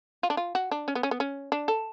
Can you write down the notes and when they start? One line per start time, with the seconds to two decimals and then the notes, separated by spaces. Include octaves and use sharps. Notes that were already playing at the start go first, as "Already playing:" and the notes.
0.23 F4
0.30 D4
0.37 F4
0.55 F#4
0.71 D4
0.88 C#4
0.95 B3
1.03 C#4
1.11 B3
1.20 C#4
1.52 D4
1.68 A4